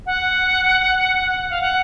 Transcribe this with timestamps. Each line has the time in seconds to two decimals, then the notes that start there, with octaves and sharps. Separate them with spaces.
0.06 F#5
1.50 F5
1.61 F#5